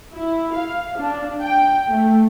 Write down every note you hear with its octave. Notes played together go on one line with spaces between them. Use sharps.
E4
F5
D4
G5
A3